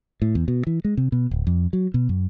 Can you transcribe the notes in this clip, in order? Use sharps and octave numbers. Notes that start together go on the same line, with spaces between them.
A2
E2
B2
E3
G#3
C3
B2
D1
F2
F#3
B2
F#2